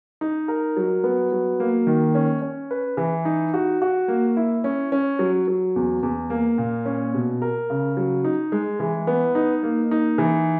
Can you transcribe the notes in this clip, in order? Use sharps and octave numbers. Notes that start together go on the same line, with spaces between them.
D#4
A#4
F#3
B3
F#3
A#3
D#3
C#4
C#4
B4
E3
D#4
F#4
F#4
A#3
E4
C#4
C#4
F#3
F#3
E2
E2
A#3
A#2
C#4
B2
A#4
C#3
F#3
D#4
G#3
E3
B3
D#4
A#3
D#4
E3